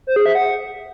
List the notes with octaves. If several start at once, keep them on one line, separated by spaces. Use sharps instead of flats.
C5
G#4
E5
F#5